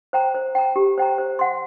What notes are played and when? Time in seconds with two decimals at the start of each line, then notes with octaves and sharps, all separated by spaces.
0.13 C5 G5 A#5
0.34 C5
0.55 G5 A#5
0.76 G4
0.98 C5 G5 A#5
1.18 C5
1.39 F#5 C6